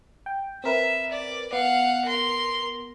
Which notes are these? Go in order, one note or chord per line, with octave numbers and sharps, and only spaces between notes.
G5
C4 A#4 B4 E5
D5
B3 F5 F#5
A#4 C6